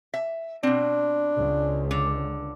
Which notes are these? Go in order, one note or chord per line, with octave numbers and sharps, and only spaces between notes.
E5
B2 C4 D4
C#2
D3